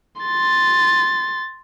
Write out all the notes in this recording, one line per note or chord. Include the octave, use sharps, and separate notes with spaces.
C6 A6